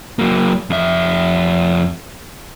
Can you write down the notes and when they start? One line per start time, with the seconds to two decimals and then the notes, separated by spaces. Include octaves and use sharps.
0.19 F#3 A#3
0.70 F2 E5